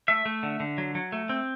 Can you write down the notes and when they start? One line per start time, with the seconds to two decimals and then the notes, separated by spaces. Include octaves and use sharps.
0.08 A3 E5
0.26 A3
0.43 D3
0.60 D3
0.78 F#3
0.95 F#3
1.12 A3
1.29 C4